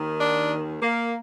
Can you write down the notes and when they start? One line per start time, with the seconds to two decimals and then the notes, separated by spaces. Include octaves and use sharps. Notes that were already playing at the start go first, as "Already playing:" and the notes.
Already playing: D#2 D#3
0.20 D4
0.82 A#3